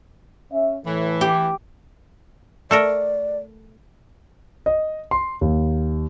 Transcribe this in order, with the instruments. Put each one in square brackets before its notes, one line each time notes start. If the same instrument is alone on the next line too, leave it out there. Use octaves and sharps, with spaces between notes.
[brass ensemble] C#4 E5
[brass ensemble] A2 [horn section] E3
[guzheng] G4
[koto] A3 A4 A#4 [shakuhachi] D5
[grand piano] D#5
C6
D#2